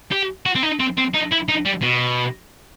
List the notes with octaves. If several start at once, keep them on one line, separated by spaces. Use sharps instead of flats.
G4
F#4
C4
D#4
C4
C4
D#4
E4
D#4
G3
B2